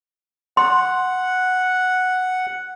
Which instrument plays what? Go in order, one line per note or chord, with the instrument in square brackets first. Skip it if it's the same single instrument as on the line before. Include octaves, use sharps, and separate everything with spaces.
[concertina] F#5 [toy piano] C6